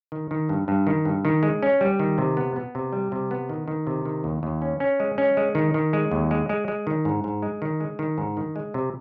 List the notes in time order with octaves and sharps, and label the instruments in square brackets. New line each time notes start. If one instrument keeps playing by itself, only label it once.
[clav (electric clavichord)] D#3
D#3
G2
G2
D#3
G2
D#3
G#3
C#4
G3
D#3
C3
B3
B3
C3
G3
C3
B3
D#3
D#3
C3
D#3
D#2
D#2
C#4
C#4
G#3
C#4
G#3
D#3
D#3
G#3
D#2
G#3
G#3
G#3
D#3
G#2
G#2
G#3
D#3
G#3
D#3
G#2
D#3
G#3
C3